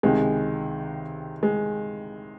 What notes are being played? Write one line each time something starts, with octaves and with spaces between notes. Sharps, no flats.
C#2 C3 D#3 G#3
G#3